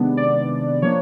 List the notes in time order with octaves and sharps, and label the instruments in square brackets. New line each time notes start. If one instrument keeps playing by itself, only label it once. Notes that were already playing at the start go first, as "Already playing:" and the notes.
Already playing: [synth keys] C3 D#3 G#3 B3 D4
D5
F3 A#3 D4 C#5